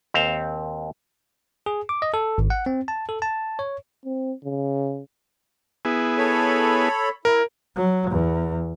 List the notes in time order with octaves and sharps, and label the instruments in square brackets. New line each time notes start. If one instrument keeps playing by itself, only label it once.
[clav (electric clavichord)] D#2 C4 C5 F5
[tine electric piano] G#4
D6
D#5
A4
G#1
F#5
C4
A5
A4
A5
C#5
[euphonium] C4
C#3
[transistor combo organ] B3 E4 G#4
[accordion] A4 C#5 B5
[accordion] E4 [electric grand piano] A#4
[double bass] F#3
E2